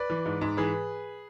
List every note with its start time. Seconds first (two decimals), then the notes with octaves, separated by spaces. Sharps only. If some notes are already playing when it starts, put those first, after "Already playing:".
Already playing: B4 D5
0.10 E3
0.26 G#2
0.41 G#2
0.57 E3 G#4 B4